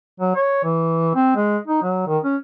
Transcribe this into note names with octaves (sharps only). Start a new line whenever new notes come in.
F#3
C#5
E3
C4
G#3
D#4
F#3
D#3
C#4